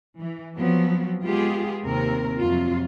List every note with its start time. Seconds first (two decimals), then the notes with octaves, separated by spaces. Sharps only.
0.19 E3
0.58 F3 F#3 B3 C4
1.23 G#3 B3 F4 G4 G#4
1.84 D#2 C3 C4 A#4
2.41 F2 C3 F#3 F4